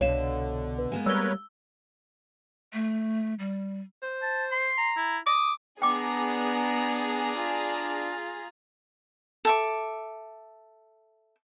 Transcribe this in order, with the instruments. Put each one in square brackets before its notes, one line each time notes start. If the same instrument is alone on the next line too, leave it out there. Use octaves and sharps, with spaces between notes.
[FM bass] C2 [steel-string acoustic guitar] B2 [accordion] D3 [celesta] C#5 F5 E7
[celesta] B4
[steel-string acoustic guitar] G#3 A#3 B3
[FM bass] G3 [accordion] A#4 B4 C#5 [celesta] E6 G7
[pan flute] A3
G3
[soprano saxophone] C5
[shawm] A5
C6
[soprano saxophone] A#5
[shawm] E4
[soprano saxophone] D6 [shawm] D#6
[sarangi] B3 [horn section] D4 [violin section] G#4 A#5 [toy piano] G5 D6
[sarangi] F4
[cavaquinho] A4 E5 D6